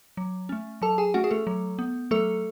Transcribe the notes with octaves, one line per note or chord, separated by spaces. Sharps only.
F#3
A3 C#4
F#3 A4 A5
G#4 G#5
A3 C#4 F#4 F#5
G#4
A3 A4
F#3
B3
F#3 A3 A4